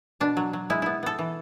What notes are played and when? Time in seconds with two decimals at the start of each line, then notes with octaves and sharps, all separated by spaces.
0.20 B2 D4
0.37 F#3
0.53 F#3
0.70 G#3 E4
0.82 B3 E4
1.03 B3 A4
1.19 E3